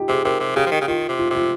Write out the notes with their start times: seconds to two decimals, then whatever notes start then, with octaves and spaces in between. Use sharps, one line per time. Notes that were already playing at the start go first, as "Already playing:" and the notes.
Already playing: D#4 F4 G4
0.08 C3 G#4
0.25 C3 A#4
0.40 C3
0.56 C#3 G4
0.67 F3
0.72 D#3
0.81 C#3
0.88 D#3 F4
1.09 C3
1.19 F4
1.30 C3 F4